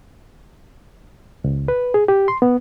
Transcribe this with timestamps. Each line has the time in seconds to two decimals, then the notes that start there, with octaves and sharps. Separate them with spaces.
1.44 C#2
1.68 B4
1.94 G#4
2.08 G4
2.28 C6
2.42 B3